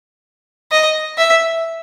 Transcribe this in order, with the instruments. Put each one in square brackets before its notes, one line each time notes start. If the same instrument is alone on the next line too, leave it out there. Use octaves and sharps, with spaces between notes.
[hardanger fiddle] D#5
E5